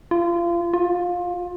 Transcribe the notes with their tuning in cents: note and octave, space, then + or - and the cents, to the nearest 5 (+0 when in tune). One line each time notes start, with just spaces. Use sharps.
F4 -30
F4 +20